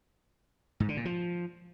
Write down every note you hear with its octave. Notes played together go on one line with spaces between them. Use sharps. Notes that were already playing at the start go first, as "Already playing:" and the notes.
G#2
D3
A#2
F3